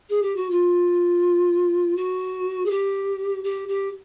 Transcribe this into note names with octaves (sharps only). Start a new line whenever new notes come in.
G#4
G4
F#4
F4
F#4
G#4
G4
G4
G4